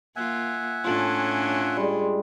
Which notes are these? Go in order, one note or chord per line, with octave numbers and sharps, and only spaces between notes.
A#3 F4 E5 F#5 G#5
A2 C#4 D4 F4 A4 A5
G3 G#3